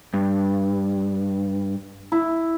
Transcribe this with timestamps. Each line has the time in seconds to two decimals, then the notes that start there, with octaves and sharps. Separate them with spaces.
0.14 G2
2.12 E4